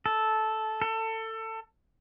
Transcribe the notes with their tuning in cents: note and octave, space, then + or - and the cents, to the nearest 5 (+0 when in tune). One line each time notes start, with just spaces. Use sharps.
A4 -10
A4 +25